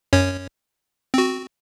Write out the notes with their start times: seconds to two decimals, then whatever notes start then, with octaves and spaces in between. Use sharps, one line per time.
0.13 F#2 C#4 C#5
1.14 C4 F#4